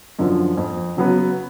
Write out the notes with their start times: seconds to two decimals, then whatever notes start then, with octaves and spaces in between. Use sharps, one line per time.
0.19 F#2 D3 F3
0.57 F2
0.97 C#3 F#3 B3